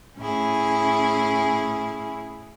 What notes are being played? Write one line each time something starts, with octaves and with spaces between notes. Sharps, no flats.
A2 C#4 E4 G#4